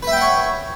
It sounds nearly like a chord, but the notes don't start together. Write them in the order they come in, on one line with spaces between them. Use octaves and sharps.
B4 E5 G5 F#5 C#5